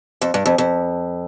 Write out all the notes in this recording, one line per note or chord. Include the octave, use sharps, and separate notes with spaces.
F2
G2
F2
F2